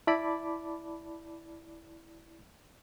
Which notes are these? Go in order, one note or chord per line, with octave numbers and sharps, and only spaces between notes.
E4 D5 A5 B5 D6